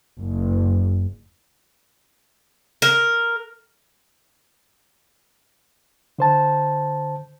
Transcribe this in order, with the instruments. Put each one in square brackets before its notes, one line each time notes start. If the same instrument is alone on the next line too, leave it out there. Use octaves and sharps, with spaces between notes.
[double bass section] F#1
[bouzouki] A#4
[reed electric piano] D3 C5 A5